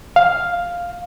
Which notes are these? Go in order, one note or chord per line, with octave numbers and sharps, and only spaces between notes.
F5